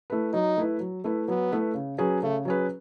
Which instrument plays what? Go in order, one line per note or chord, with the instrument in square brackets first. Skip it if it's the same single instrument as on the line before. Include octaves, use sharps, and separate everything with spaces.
[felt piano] A3 E4 B4
[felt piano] F#3 [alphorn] D#4
[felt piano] A3 E4 B4
F#3
A3 E4 B4
[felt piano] F#3 [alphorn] B3
[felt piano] A3 E4 B4
C#3
F#3 C#4 G#4 B4
[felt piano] C#3 [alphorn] A3
[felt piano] F#3 C#4 G#4 B4